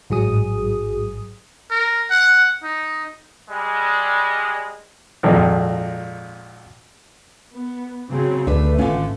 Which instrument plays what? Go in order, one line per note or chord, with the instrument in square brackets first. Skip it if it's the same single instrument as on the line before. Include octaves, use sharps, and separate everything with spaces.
[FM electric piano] A1 G#2 F#3 G#4 D#6
[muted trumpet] A#4
F#5
D#4
[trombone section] G3 G#3
[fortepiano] G#1 F2 A#2
[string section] B3
C#3 F#3 C4
[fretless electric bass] D2 [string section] A3 [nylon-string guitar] D4 B4
[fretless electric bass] G#1 C#4 [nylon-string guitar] D3 B3 F4